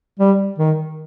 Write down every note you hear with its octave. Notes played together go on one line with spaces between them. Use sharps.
G3
D#3